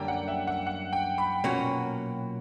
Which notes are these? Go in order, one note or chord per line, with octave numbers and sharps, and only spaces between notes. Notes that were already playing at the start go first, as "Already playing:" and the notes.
Already playing: F#2 D3 G3 A#3 G5
F#5
E5
F#5
F#5
G5
B5
B1 A#2 A#3 C#4 F#4